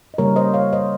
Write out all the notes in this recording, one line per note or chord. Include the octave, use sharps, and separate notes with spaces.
D#5
C#3 G3 A#3 A#4 C#5
C5 D#5
C#5 F5
C5 D#5